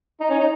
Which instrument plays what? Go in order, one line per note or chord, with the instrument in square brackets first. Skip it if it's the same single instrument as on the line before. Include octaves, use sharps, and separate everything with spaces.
[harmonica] D#4
C#4
D#4